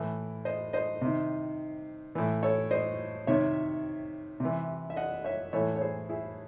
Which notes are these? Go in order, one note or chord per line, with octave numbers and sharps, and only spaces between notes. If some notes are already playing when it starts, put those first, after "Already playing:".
Already playing: A2 E3
C5 D#5
C5 D#5
C3
D#3
A2 E3
A4 C#5
C5 D#5
C3 D#3 C#5 E5
C3 E3
E5
D#5 F#5
C#5 E5
A2 E3 A4 C#5
C#5
G#4 C5
E4 G#4